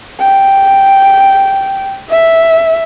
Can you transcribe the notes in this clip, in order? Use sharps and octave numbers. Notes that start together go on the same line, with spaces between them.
G5
E5